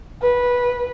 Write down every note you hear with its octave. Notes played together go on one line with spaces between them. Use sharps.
B4